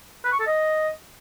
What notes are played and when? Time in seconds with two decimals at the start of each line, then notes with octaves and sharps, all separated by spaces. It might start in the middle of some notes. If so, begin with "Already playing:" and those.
0.25 B4
0.32 C#6
0.40 A4
0.47 D#5